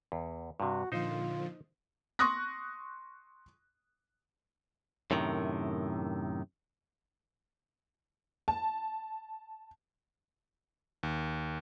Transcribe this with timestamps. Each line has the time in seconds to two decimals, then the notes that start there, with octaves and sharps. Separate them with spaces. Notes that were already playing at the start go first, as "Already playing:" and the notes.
0.12 E2
0.60 G2 C3 F#4
0.92 A#2 D3 F3 D#4 F4 C5
2.19 C6 C#6 D#6 F#6 A#6
5.11 F#2 A2 C3 D#3
8.48 A5
11.03 D#2